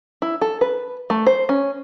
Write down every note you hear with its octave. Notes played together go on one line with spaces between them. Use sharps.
E4
A4
B4
A3
C5
C#4